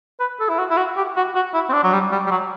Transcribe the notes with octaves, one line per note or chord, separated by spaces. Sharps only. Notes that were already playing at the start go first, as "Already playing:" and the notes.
B4
A4
E4
F#4
E4
F#4
G4
F#4
F#4
E4
C4
D4
F#3
G3
G3
G3
F#3